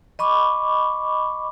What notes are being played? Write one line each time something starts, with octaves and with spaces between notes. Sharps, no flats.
D#5 B5 C#6 D6